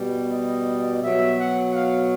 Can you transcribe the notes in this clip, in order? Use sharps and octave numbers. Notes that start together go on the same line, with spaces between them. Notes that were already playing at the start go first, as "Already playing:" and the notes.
Already playing: B2 G3
D#5
B2 F#3 E5
F#5
F5